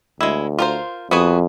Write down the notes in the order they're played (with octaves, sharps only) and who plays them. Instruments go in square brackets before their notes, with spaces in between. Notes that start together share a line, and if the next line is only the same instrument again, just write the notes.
[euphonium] D2 [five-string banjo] G#3 E4
[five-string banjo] F4 A#4 C5
[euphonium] F2 [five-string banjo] B3 F#4 G#4